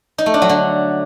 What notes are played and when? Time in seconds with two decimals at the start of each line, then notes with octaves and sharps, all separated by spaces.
0.18 D#4
0.26 A3
0.34 D4
0.42 F#3
0.49 D3